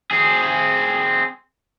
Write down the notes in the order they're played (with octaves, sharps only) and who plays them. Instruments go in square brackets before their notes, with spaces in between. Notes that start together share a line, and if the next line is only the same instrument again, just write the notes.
[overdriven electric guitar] C4 G#4